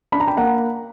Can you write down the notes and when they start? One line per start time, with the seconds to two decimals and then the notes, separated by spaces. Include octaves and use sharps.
0.12 D4 B5
0.20 A#5
0.27 G5 B5
0.37 A#3 F#5 A#5